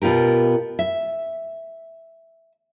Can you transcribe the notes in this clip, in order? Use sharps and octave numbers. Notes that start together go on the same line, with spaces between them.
B2 B3 F4 G4 A#4
E5